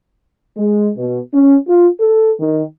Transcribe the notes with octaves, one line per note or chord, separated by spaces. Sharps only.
G#3
B2
C#4
F4
A4
D#3